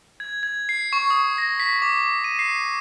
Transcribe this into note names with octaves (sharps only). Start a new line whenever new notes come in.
G#6
G#6
C7
C#6
D#6
A#6
B6
D6
D#7
C7